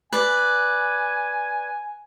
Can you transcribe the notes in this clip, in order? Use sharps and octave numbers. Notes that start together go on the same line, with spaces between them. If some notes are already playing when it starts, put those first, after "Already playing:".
B4 D5 G#5